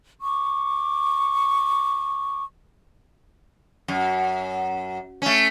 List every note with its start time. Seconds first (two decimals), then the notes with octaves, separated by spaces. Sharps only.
0.21 C#6 D6
3.88 F#2
5.22 A3 C#4